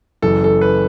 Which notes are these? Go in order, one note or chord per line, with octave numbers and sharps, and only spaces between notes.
F#1 F#2 E3 A4
A4
B4